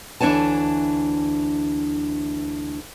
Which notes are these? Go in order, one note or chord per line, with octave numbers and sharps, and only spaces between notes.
D2 E3 D4 C#5 G#5 A5